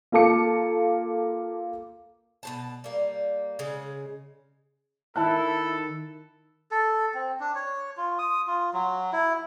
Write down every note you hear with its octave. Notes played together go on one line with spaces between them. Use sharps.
A#3 F4 A4 A5 D6 C#7
B2 C4 A5
G3 A#3
C#3 G#3
D#3 E4 A4 E5 A5 F#6
A4
C4
D4
C#5
F4
D#6
F4
F#3
E4